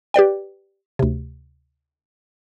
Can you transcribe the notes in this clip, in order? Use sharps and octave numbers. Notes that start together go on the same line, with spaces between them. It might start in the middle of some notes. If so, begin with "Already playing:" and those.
G4 B4 D5 G5
D2 C3